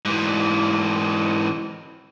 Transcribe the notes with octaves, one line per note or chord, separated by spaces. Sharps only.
G#2 E3